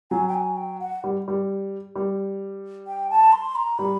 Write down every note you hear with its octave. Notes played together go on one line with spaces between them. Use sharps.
F#3 G#5
G5
G#5
G5
F#5
G3
G3
G3
G5
A5
C6
A#5
G3 B5